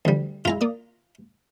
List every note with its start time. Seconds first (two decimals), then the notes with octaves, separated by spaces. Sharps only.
0.05 D2 E3 F3 G3
0.45 F#2 G#3 E4 F4 A#5
0.61 A#3 D5 D#6